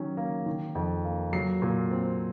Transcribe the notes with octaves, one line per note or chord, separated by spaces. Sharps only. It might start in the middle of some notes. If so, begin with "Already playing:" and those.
Already playing: D#3 F#3 C#4
A#3
D#3
F2
A#3
F#3 C7
A#2
C4